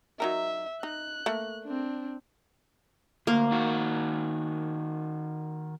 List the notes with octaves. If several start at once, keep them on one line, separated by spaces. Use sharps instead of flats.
F#3 D#4 A#4 E5
D#4 F#6
A3 A#3
C4 D4
D2 A#3
D#3 F#4